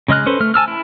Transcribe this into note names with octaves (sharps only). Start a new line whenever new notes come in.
C#3 G#3 D#5 F6 F#6
C#4 A4 B4 C5
A3 F6
G#5 A5 E6 F6
E4